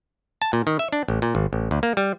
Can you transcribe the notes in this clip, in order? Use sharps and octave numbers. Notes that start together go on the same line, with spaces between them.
A5
A#2
D#3
E5
D4
A1
A#2
G#1
A1
D2
A#3
G3